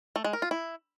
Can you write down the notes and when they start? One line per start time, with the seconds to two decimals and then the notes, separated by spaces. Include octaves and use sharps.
0.16 A3
0.24 G#3
0.33 A#4
0.42 F4
0.51 E4